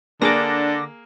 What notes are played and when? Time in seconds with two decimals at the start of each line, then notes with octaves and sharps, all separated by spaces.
0.22 D3 A#3 D4 G#4 D6 A#6